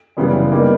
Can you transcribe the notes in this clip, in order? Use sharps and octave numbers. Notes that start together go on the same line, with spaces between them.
F#2 C#3 E3 G3 B3
G3 A#3 D#4